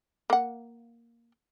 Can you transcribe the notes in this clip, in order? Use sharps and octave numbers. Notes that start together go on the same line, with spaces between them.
A#3 F#5